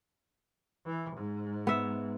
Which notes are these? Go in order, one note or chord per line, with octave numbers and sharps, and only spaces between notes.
E3
G#2
B3 E5